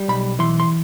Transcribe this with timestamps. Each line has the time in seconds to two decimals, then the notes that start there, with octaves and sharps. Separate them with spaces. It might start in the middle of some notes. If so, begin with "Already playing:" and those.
Already playing: G3
0.08 B1 B5
0.39 E3 C6
0.60 C6